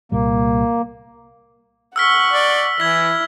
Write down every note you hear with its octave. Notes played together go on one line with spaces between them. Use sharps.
C2 A#2 G3 A#3
F#5 C#6 E6 F6 B6
D5
E3 E4 G#6 B6